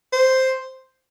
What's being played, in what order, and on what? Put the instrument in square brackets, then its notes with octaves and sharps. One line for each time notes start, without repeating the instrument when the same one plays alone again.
[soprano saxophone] C5